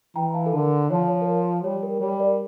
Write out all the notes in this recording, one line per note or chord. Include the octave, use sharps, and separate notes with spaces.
E3 G5 A#5
F5 A5
A4
D3 A#4
F3 C#5
C#5
A#4
C#5
G3 C#5
A#4
G3 C#5
A#4 D5